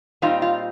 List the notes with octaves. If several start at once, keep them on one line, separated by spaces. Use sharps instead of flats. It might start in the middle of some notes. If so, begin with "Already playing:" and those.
A#2 G3 C4 D#4 F4
F4